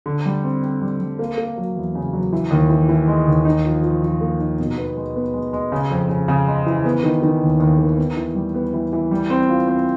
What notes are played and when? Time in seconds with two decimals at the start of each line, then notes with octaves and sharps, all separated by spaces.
0.06 D3
0.26 G3
0.44 C4
0.63 C4
0.81 G3
1.01 G3
1.19 A#3
1.38 A#3
1.57 F#3
1.76 E2
1.95 C#3
2.13 F#3
2.33 E3
2.51 D#2
2.70 E3
2.89 E3
3.08 G#3
3.27 D#2
3.45 D#4
3.65 F3
3.83 F3
4.02 F3
4.21 A#3
4.39 D#4
4.59 B2
4.78 B3
4.97 G#3
5.16 B3
5.34 G#3
5.53 G#3
5.72 C#3
5.91 F2
6.10 C#3
6.28 C#3
6.47 G#3
6.66 E3
6.85 B3
7.04 D#3
7.22 D#3
7.42 D#2
7.60 D#2
7.79 D#3
7.97 B3
8.17 E3
8.35 G3
8.54 B3
8.74 E3
8.93 E3
9.11 G3
9.30 C4
9.49 F4
9.68 C4